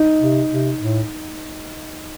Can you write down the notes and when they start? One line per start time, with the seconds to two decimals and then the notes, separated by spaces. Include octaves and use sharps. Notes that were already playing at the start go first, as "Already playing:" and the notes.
Already playing: D#4
0.21 C3
0.51 C3
0.80 A2